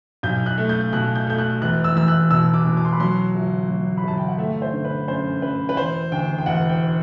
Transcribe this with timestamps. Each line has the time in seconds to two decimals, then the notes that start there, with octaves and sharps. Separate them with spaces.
0.23 B1 G6
0.46 F#6
0.58 A3
0.69 G6
0.93 B2 F#6
1.15 G6
1.27 A3 G6
1.38 F#6
1.61 E1 F#6
1.84 E6
1.96 E2 E6
2.08 F#6
2.31 B2 E6
2.54 D6
2.66 B2
2.77 D6
2.85 C6
2.93 B5
3.00 F#3 C6
3.35 G1
3.69 F#3
3.97 B5
4.04 G1 A5
4.18 G5
4.28 F#5
4.38 A3 E5
4.62 C5
4.73 D3
4.84 B4
5.08 F#2 C5
5.42 F#2 B4
5.69 B4
5.77 E1 C5
6.12 D2 G5
6.38 G5
6.46 E1 F#5
6.69 G5